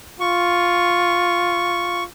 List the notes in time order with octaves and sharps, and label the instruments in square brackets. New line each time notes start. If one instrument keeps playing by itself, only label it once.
[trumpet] F4 [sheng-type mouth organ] C#6